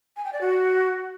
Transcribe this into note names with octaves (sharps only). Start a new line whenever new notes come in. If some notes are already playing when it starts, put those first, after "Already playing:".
G#5
G5
D5
F#4